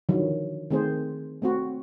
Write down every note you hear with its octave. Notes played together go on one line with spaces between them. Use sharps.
D3 D#3 F3 F#3
D#3 A3 C4 G#4 C5
A3 C4 F#4